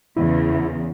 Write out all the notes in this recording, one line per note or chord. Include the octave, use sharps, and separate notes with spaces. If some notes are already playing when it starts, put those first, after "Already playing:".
E2 C#3 E4